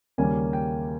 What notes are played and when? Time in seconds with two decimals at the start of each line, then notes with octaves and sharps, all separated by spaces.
0.18 D#2 C#3 G3 A#3 C#4 G#5
0.53 G5